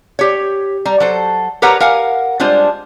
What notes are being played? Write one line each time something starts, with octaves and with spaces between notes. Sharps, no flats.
G4 C#5
G3 A#5
F#3 A4 C5
G4 A#4 B4 C#5 F#5 A#5
A#4 F5 F#5 G#5
G3 G#3 D4 F4 C5